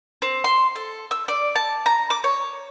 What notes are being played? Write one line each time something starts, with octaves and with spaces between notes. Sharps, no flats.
C4
C6
A4
E6
D5
A5
A#5
D6
C#5